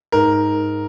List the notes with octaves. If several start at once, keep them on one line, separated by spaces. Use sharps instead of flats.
G#2 A#4